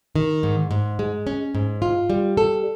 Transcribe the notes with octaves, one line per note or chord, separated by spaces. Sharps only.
D#3
G#2
G#2
G#3
C#4
G#2
F4
G3
A4